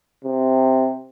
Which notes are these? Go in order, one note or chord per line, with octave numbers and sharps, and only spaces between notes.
C3